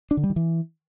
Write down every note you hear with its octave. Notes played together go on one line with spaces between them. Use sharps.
D4
D3
G3
D#3
E3